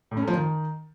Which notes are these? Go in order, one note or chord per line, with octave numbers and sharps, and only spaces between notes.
A2
C#4
A3
F3
D#3